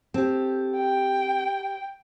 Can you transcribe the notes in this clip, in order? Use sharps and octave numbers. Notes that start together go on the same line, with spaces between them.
C4 G4 A4
G5